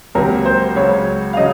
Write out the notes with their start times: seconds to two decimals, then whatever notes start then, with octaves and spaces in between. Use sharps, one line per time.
0.15 C#2 C3 F#3 A#3 A#4
0.45 C5
0.76 C#2 C#3 F#3 C#5
1.33 F5
1.37 C#3 F#3 D#5